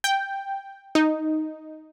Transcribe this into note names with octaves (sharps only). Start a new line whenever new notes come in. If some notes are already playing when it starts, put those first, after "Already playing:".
G5
D#4